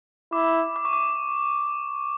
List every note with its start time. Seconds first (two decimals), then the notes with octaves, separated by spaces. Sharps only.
0.32 E4 D6
0.76 D6
0.85 C#6
0.93 D6